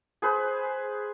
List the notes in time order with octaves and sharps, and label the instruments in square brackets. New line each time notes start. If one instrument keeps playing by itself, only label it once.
[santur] G#4 B4 C5